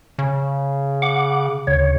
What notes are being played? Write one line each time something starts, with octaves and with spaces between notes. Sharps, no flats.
C#3
F#5 D6
D2 C#3 C#5